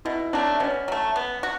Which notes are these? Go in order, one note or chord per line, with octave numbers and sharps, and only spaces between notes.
B2 E4
F#3 A3 D4
B2 C#4
F#3 A3
B3
F#4